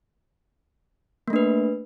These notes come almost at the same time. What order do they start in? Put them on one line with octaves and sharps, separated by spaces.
A#3 A3 D4 B4